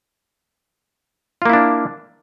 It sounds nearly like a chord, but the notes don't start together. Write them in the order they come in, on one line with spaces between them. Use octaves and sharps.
F4 A#3 E4 D4